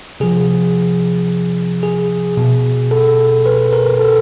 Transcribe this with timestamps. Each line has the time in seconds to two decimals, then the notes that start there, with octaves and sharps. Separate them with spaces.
0.20 C3 F3 G#4
1.83 G#4
2.37 B2
2.91 A4
3.46 B4
3.73 A#4
3.99 A4